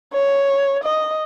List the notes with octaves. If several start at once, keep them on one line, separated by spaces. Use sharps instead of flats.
C#5
D#5